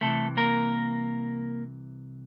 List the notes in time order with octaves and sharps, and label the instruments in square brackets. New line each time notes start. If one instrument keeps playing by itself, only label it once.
[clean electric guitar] C2 C3 E3 A3 A4
A#3 A#4